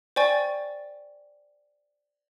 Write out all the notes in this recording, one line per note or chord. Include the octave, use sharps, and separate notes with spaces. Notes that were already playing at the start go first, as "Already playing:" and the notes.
C5 D5 G5 G#5 C#6 A6